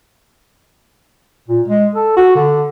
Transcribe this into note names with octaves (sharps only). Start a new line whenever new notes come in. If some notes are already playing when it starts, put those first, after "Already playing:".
A#2
G#3
A4
F#4
D3